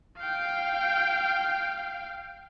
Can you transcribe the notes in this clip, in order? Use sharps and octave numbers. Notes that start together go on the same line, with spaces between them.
F5 G5